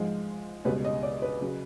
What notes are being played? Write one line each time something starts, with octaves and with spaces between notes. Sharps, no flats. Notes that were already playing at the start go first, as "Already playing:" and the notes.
Already playing: G#2 F3 G#3
C#2 B2 G3 B4
D#5
D5
B4
C#3 F#3